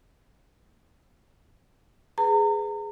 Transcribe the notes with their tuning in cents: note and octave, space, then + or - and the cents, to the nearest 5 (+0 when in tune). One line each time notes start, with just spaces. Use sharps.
G#4 +0 B4 +15 A#5 -35